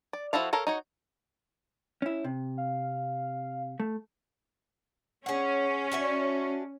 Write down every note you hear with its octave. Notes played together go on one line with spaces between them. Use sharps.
D5
F3 E4 F#4 A4 F5
A4 A#4 C#5 F5
D#4 F#4 C#5
C#4 E4
C3
F5
A3
C#4 G#4 F#5
D4 F#4 E5